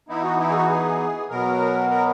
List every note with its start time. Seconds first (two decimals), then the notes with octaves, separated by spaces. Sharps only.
0.08 E3 B3 D#4 E4
0.23 F#4
0.39 E4
0.50 G#4
0.54 F#4
0.70 G#4
1.30 B2 F#3 B3 A#4
1.90 A#4